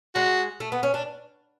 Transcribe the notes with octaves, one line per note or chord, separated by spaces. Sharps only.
G#3 F#4
A3
B3
C#4
D4